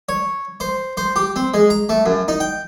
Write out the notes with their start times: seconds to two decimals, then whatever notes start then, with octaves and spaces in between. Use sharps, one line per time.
0.09 C#5
0.60 C5
0.97 C5
1.16 G4
1.36 C4
1.54 G#3
1.70 A#5
1.89 A3
2.06 F#2
2.28 D#4
2.40 G5